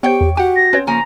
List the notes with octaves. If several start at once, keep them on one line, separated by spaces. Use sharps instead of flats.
B3 G4 C5 C#5 G5
E2
F#4 G4 F#5 G5
A#6
C4 C#4 B4 C#5
C#3 F3 A#3 G#5 A#5